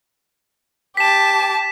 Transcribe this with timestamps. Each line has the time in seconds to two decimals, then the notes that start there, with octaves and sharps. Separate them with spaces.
0.97 G4 A5 B6 E7